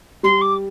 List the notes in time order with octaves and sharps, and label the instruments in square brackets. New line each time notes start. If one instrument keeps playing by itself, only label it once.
[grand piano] G3 [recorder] C6
[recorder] D6